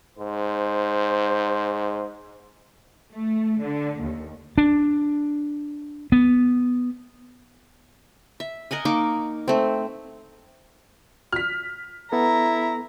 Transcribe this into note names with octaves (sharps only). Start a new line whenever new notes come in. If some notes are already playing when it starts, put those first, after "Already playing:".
G#2 C5
A3
D3
D#2
D4
B3
E5
A#4 D#5 F#5 G#5
A#3 D#4 C#6 D6
A3 C4
F6 B6
B3 E4 A4 A#5